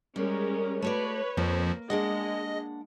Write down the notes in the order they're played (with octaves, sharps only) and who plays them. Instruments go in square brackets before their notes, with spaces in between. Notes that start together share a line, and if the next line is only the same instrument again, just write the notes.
[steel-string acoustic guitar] G3 [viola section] G#3 C#4 A#4
[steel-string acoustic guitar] A3 F#4 D5 [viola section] B4 C#5
[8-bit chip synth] F2 F3 [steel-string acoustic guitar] A#3
[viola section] G#3 [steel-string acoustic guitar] A#3 D4 F#5 [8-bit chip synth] D#5